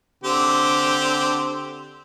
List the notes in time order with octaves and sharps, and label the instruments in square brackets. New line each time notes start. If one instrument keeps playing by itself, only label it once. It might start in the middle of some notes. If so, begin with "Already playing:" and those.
[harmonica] D3 C4 G4